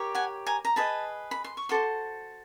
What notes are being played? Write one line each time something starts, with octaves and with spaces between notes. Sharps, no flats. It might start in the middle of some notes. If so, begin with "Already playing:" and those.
Already playing: G4 A#4 C#5
F#5 G#5
G#5 A#5
A#5
G#4 B4 D#5 A5 B5
B5
C6
C#6
F#4 A4 C5 C6 D6